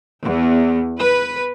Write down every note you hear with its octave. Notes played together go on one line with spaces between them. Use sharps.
E2
B4